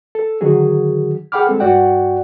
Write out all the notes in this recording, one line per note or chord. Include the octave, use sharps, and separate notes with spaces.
A4
D3 D#3 F#3 F#4 G#4
G#4 F#5 G5 B5 D6 F6
G#3 C4 A4
G2 F#4 D5 F#5 G5